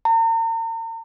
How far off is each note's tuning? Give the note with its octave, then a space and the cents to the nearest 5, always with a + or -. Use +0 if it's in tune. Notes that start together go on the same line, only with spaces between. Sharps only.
A#5 -40